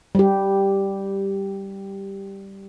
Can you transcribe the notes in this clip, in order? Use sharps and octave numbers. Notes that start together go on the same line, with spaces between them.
G3 G4